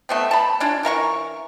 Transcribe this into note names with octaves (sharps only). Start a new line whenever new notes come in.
A3 B3 C4
A5 B5
C#4 D4 F4
E3 A#4 F5 C#6